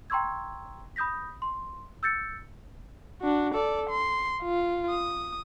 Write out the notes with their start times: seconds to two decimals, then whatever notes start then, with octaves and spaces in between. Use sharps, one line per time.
0.10 G5 A#5 C6 C#6 E6 G#6
0.96 B5 D#6 G6 A#6 B6
1.42 C6
2.03 E6 G6 A6 C#7
3.21 D4 F#4
3.54 A4 D5
3.90 C6
4.43 F4
4.90 D#6